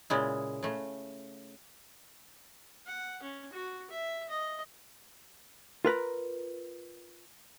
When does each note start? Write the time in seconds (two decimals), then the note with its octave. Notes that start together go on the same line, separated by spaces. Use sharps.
0.10 A#2 C#3 G#3 E4
0.63 C#3 A3
2.86 F#5
3.23 C#4
3.53 F#4
3.91 E5
4.29 D#5
5.85 F4 A#4 B4 A#5